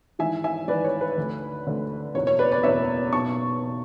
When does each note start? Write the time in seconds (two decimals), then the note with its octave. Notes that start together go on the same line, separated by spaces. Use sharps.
0.19 G#1 G#2 E3 E5 G#5
0.44 E5 G#5
0.68 G#1 G#2 E3 B4 D5
0.84 C#5
1.01 B4
1.17 D2 D3
1.66 D2 D3
2.15 F#1 E2 B2 C#5
2.27 C#5
2.39 B4 D5
2.51 B4 D5
2.63 F#1 E2 B2 C#5 E5
3.13 B1 B2 A5 C#6
3.62 B2